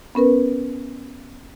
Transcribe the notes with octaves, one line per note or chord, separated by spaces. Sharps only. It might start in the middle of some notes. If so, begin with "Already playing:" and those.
B3 C#4 A#4 B4